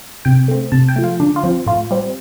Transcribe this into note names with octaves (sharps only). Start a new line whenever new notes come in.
C3 G5
A3 C4
C3 A5
G5
F3 A3
F4
D3 D4
F4
F3 C4
A2 F4
G3 C4